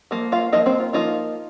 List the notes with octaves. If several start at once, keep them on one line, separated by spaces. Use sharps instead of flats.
F3 A#3
F4 F5
F3 A#3 D#4 D#5
C4 C5
F4
F3 A#3 D#4 F4